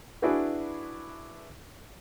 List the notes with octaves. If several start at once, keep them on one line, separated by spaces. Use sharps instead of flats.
D4 E4 F#4 G#4 B4